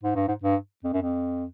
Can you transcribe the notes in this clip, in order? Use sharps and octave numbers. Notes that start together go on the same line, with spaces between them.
G#2
G2
G#2
G2
F2
F#2
F2